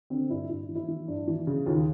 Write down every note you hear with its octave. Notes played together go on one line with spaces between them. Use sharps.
D3 C4
G2 E4
G2 E4
E3
E4
E3
G2
E3
C#3
D#2 F4